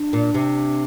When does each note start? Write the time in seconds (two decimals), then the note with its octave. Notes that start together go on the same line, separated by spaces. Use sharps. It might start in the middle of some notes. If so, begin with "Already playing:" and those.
Already playing: D4
0.13 A#2
0.34 C3